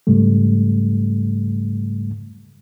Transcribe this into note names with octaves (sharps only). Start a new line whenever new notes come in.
G#2 C#3 G3 A3